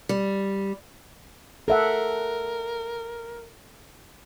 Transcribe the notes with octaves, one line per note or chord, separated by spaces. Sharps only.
G3
A4 A#4 E5 F#5